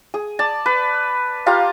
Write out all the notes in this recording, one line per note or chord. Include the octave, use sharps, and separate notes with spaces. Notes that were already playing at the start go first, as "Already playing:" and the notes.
G#4
D5 A5
B4
F4 G4 F5 A#5